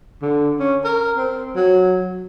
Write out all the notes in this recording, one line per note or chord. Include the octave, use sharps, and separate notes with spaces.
D3
C#4
A#4
C4
F#3